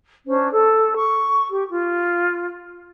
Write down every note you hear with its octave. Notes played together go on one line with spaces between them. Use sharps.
C#4 D4 C5
A4
C#6
G4
F4